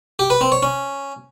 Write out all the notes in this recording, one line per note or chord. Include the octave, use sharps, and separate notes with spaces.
G4
B4
C4
C#5
C#4